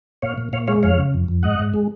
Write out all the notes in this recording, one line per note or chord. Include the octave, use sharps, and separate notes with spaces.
A#2 C#5 F5
A#2
A#2 C#5 F5
G#3 C#5 F5
F2 C#5 F5
C#3
F2
F2
G#2 D#5 F#5
G#2
G#3